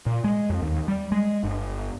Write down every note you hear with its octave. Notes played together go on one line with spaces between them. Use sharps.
A#2
G#3
F2
D#2
G3
G#3
G1